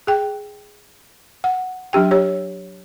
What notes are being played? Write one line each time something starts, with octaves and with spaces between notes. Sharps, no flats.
G#4 G5
F#5
F#3 D4 G4 G5
G4 C#5